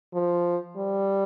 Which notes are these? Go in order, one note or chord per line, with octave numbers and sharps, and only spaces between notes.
F3
G3